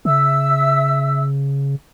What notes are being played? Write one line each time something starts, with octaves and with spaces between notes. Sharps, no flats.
C#3 E5 E6